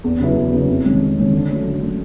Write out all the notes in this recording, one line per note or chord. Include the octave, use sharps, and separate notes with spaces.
E2
C#3 F#3 B3 E4
E2
C#3 F#3 B3 E4
F2
C3 D#3 G#3 C#4
F2
C3 D#3 G#3 C#4
D3
F#3 A3 C#4
D3
F#3 A3 C#4